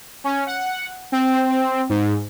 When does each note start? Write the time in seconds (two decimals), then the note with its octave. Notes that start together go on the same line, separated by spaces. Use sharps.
0.24 C#4
0.46 F#5
1.12 C4
1.89 G#2